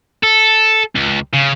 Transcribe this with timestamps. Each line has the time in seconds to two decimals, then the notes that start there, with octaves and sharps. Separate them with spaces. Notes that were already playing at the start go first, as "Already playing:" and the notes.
0.23 A4
0.95 C#2
1.33 C#3